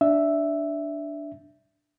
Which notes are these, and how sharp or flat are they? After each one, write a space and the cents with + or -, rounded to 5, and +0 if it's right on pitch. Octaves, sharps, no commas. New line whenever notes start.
D4 +0 E5 +0